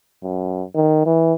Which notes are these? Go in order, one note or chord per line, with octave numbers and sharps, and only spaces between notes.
F#2
D#3
E3